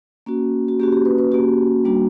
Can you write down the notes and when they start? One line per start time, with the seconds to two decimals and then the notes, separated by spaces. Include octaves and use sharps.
0.26 A#3 C#4 F#4
0.68 F#4
0.80 A#3 C#4 F#4 G4
0.92 G4
1.05 B4
1.18 B4
1.31 A#3 C#4 F#4 G4
1.85 G3 A#3 D4 F#4